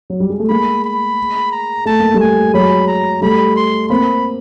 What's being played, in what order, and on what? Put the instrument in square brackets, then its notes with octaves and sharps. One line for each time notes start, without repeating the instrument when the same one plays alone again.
[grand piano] F#3
G3
G#3
A3
[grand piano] G#3 A#3 [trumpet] B5
[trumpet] B5
A#5
[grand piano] A3 [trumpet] A5
[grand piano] A#3
G3 A3
[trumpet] G#5
[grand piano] F#3 G#3 [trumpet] B5
[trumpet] A#5
[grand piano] G3 A3 [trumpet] B5
[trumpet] C6
[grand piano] A#3 C4 [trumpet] B5